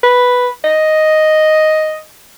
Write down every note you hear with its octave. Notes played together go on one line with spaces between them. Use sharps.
B4
D#5